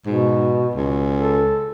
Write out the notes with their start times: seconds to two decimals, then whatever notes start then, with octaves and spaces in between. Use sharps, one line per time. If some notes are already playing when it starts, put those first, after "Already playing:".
0.06 G#2 B2
0.75 C#2
1.17 A4